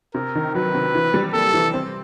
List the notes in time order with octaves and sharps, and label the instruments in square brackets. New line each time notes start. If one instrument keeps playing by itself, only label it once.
[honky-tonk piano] C3 [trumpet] A#4
[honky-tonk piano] D#3
[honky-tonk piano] F#3 [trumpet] B4
[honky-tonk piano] C3
E3
G3
[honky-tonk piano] A#3 [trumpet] A4
[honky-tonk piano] E3
C4